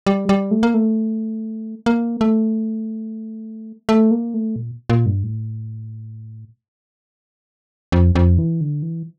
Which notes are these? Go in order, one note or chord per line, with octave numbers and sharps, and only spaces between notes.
G3
G3
A3
A#3
A3
A#3
A3
A3
A#3
A3
A#2
A#2
G2
A2
F2
F2
E3
D3
E3